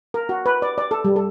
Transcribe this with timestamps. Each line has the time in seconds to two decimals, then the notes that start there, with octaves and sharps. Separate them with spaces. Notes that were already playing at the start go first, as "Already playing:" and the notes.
0.14 A#4
0.29 F#4
0.46 B4
0.62 D5
0.78 D5
0.91 A4
1.05 G3
1.16 A4